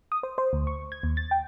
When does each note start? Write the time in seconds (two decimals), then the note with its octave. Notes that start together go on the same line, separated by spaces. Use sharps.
0.12 D#6
0.23 C5
0.38 C5
0.53 D2
0.67 C#6
0.92 G#6
1.03 D#2
1.17 A6
1.31 G5